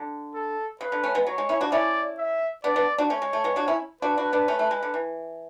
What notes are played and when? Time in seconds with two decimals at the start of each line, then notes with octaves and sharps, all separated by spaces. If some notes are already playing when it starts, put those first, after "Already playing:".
Already playing: D3
0.34 A4
0.81 C#3 B4
0.92 D3
1.03 A3 C#4
1.15 G#3 B3
1.27 F#3 C#5
1.38 G#3
1.49 C#4 E4
1.61 D4 F#4
1.72 C#4 E4 D5
2.18 E5
2.64 B3 D4 D5
2.76 B3 D4
2.98 D4 F#4
3.10 A3 C#4 C#5
3.22 G#3
3.33 A3
3.44 G#3 B3
3.56 D4 F#4
3.68 C#4 E4
4.02 D4 F#4 B4
4.17 D4 F#4
4.33 B3 D4
4.48 A3 C#4
4.59 A3
4.71 G#3
4.83 D3
4.94 E3